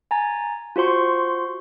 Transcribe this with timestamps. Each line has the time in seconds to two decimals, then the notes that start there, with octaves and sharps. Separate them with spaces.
0.11 G#5 A#5 A6
0.76 F4 F#4 C5 C6 C#6